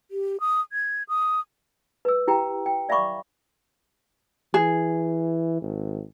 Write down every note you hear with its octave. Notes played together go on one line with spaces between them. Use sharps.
G4
D#6
G#6
D#6
B4 E6
E4 G4 G5 A#5
G5
D5 E5 F5 B5 C#6 D6
E3 G#4
G#1